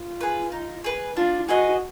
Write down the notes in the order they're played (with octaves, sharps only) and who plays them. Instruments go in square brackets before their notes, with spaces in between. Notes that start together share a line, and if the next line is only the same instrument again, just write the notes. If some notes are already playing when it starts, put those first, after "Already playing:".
Already playing: [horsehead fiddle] F4
[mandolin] G#4 B4
D#4
G#4 B4
[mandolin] D4 [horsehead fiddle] F4
[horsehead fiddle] F#4 [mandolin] G#4 B4 D#5